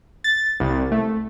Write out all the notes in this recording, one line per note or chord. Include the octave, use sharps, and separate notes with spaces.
A6
C2
A3